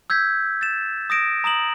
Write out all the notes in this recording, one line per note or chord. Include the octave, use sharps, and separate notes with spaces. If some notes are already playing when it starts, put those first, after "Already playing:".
E6 G6 G#6 B6
A6 E7
D#6 A#6 D7 E7
A#5 D#6 E7 F#7